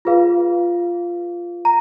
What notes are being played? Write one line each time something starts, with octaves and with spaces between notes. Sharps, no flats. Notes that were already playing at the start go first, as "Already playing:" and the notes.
F4 G#4 B4 F5
A#5